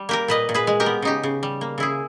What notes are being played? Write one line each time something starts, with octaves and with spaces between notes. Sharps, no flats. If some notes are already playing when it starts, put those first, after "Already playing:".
Already playing: G3
A#3 G4 A#4
A#2 B4 D#5
A#2
G#4 B4
G#3
G4 A#4
B3
C#3 D#4 G4
C#3
G3
A#3
C#3 E4 G#4